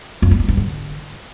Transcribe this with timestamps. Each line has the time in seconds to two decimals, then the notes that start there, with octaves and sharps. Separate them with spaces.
0.22 F2
0.31 A3
0.40 F#3
0.48 G2
0.57 D3